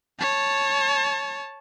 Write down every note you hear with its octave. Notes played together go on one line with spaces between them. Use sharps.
C#5 A5